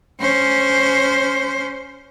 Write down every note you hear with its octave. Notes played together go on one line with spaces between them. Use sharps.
C#4 C5